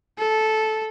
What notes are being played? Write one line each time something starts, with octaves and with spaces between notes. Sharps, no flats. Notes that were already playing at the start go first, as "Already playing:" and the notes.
A4